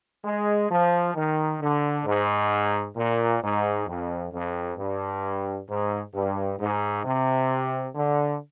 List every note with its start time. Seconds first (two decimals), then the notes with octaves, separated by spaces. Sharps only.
0.25 G#3
0.70 F3
1.15 D#3
1.60 D3
2.06 G#2
2.96 A#2
3.42 G#2
3.87 F2
4.32 F2
4.77 G2
5.69 G#2
6.14 G2
6.60 G#2
7.04 C3
7.95 D3